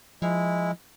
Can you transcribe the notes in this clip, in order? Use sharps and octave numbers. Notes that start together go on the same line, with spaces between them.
F3 G#3 E4